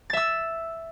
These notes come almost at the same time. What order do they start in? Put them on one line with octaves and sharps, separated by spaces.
A6 E5 E6